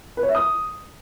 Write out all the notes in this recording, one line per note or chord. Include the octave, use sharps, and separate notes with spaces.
B4
C#5
E5
D#6